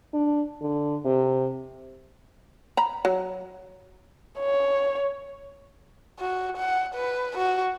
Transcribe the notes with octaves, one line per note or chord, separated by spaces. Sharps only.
D4
D3
C3
A#5 B5
F#3
C#5
F#4
F#5
B4
F#4